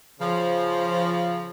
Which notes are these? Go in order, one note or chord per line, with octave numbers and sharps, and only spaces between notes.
C#3 F3